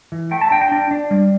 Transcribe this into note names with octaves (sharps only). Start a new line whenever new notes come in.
E3
A3 G5
A5
D4 G5
G5
D4
D4
G3